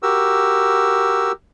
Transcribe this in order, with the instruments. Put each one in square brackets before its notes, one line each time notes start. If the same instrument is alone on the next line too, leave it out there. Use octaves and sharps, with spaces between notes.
[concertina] F#4 G4 A#4 E6